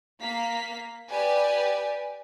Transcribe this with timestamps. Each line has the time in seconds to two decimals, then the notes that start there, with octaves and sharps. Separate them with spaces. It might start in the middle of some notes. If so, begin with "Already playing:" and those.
0.19 A#3 B6
1.09 G4 B4 D5 G#5